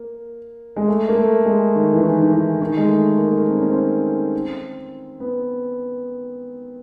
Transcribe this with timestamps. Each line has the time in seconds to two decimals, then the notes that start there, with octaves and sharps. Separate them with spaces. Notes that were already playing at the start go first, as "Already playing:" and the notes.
Already playing: A#3
0.76 G#3
0.88 A3
1.09 A#3
1.17 A3
1.45 G#3
1.75 D#3
1.93 E3
2.03 D#3
2.22 D#3
2.31 E3
2.61 D#3
2.77 G#3
2.89 A3
3.18 A#3
3.26 A3
3.32 A#3
3.47 C4
3.58 C#4
3.70 C4
5.20 B3